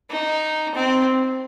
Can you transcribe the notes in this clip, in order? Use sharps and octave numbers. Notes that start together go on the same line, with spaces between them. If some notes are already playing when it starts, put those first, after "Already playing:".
D#4
C4